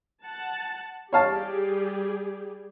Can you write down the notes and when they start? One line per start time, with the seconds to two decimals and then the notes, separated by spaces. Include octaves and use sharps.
0.24 F#5 A5
1.13 G3 G4 G#4 C#5 F5 A5